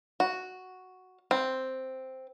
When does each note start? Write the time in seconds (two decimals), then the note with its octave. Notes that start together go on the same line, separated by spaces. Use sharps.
0.20 F#4
1.31 C4